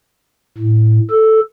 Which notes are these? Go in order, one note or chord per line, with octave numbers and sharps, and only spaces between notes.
A2
A4